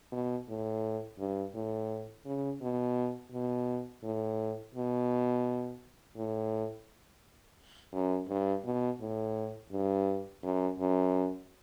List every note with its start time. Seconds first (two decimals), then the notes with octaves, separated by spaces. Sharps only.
0.12 B2
0.49 A2
1.19 G2
1.55 A2
2.25 C#3
2.62 B2
3.32 B2
4.04 A2
4.75 B2
6.17 A2
7.94 F#2
8.29 G2
8.65 B2
9.01 A2
9.72 G2
10.43 F#2
10.79 F#2